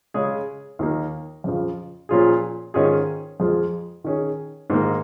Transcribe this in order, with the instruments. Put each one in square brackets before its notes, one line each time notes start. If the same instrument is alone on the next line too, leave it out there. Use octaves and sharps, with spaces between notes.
[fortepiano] C#3 G#3 C#4 G#4
D#2 D#3 A#3
F2 C#3 F3
A#2 F3 C#4 F4 G#4
G#2 D#3 C#4 F4 G#4
F2 F3 G#3 F4 G#4
D#3 C#4 G#4
G#2 D#3 A#3